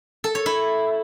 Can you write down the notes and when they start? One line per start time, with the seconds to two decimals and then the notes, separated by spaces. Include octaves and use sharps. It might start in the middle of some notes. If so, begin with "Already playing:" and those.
0.24 A4
0.35 C#5
0.46 E4